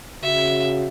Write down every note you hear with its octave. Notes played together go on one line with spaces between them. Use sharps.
C#3 F#4 E5